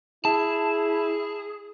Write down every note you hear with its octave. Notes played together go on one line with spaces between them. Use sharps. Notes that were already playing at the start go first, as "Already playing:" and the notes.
E4 G#4 A5